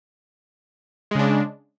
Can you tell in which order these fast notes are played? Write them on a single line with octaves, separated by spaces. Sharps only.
G#3 C#3 D4